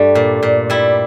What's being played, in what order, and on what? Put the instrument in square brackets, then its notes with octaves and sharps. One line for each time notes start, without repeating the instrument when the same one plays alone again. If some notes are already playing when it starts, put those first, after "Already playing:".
Already playing: [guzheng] G2 G3 A3
A#2
A#2
G3 E4